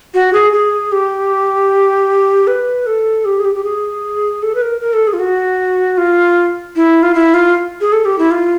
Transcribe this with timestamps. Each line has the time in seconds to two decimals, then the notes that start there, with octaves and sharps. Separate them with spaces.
0.14 F#4
0.33 G#4
0.53 G#4
0.92 G4
2.47 B4
2.86 A4
3.25 G4
3.39 G#4
3.45 G4
3.55 G4
3.64 G#4
4.43 A4
4.55 B4
4.62 A#4
4.81 A#4
4.93 A4
5.07 G#4
5.13 F4
5.20 F#4
5.98 F4
6.76 E4
7.03 F4
7.15 E4
7.34 F4
7.81 G#4
7.92 A4
8.05 G4
8.19 E4
8.31 F4